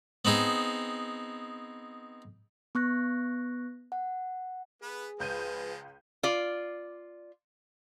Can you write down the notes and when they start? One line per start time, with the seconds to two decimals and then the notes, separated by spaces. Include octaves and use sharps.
0.25 B3 C4 D#4 G#4
2.75 B3 C#6 F#6 A#6
3.92 F#5
4.82 B3 G#4 B4
5.20 C#2 F3 G#3 B4 G6 D#7
6.23 F4 D5